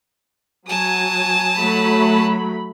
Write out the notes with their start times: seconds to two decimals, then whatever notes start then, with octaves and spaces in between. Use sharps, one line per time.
0.67 F#3 G#5 A5 D#6
1.57 F#3 A3 B5